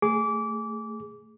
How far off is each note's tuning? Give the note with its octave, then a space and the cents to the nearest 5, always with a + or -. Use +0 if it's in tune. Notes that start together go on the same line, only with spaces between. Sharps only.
A3 +15 G#4 +0 D6 -25